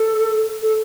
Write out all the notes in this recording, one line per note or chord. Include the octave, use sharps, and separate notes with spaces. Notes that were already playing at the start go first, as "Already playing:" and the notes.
Already playing: A4
A4